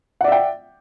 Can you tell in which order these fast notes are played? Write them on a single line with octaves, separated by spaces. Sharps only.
F#5 D5 E5 G5